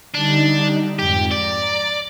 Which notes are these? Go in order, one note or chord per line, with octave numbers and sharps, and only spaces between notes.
D3 G3 D4 D#4
F2 G#2 G4
D5 A#5